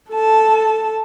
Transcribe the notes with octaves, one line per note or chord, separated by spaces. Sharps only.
A4 A5